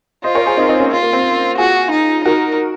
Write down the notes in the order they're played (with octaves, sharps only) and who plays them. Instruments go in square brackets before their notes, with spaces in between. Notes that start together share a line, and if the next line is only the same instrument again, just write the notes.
[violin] F4 [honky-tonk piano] C5 D#5
[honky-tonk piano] A#4 C#5
G#4 C5
C4 D#4
C4 D#4
A#3 C#4
[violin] F4
[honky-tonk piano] A#3
C4
[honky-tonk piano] F4 G#4 [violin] F#4
[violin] D#4
[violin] D#4 [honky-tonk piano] F#4 A#4